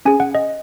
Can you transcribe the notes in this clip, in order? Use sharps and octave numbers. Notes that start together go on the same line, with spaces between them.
C#4 G#4 G#5
F#5
D#5